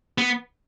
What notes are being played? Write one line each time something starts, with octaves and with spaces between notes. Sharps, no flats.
B3